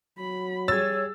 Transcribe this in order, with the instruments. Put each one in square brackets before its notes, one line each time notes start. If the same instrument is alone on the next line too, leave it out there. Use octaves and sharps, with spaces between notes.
[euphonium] F#3 [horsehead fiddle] B5
[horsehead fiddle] G3 G#4 [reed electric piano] C#5 G#6 [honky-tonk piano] E6 A6